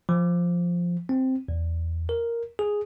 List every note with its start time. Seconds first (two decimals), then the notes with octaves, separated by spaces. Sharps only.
0.09 F3
1.09 C4
1.48 E2
2.09 A#4
2.59 G#4